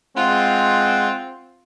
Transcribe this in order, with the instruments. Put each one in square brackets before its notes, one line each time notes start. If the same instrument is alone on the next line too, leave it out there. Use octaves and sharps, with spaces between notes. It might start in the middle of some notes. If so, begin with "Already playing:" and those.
[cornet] G#3 [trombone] C4 [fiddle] F4 [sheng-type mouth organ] F#5